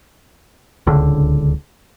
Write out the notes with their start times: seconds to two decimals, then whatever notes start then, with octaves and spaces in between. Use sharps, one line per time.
0.87 D1 C#2 D3